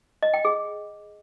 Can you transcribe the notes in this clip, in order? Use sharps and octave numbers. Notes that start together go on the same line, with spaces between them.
D#5
G5
G#4